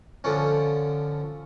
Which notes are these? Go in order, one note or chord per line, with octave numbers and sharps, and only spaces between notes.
D3 F3 C#4